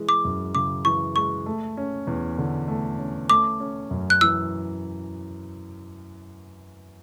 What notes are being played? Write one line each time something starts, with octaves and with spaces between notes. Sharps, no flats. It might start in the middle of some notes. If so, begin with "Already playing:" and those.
Already playing: E3 G#3
D6
F#2
C#3 D6
E3 C#6
G#3 C#6
A3
C#4
E2
D3
A3
C#4
A3 D6
C#4
F#2
F#6
E3 E6